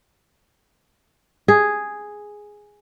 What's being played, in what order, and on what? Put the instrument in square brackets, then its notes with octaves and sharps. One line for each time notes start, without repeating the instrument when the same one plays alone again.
[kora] G#4